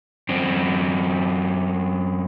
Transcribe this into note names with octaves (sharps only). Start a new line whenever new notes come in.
F#2 C4